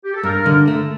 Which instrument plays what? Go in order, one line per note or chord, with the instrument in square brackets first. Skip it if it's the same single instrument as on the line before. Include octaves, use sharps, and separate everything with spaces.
[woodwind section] G4
A4
[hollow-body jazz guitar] G2 [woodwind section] A#4
[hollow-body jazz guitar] D3
A3